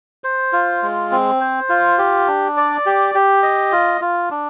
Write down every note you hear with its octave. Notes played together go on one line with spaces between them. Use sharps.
C5
F4
G#3
C4
C5
F4
G4
D4
D5
G4
G4
D#5
F4
F4
D4